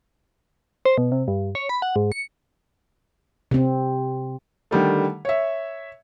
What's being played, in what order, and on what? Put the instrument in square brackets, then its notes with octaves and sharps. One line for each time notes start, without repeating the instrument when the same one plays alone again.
[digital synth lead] C5
B2
C3
G2
C#5
B5
F#5
G#2
C#7
[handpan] C3 C4
[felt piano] D3 D#3 G3 A3
C#5 E5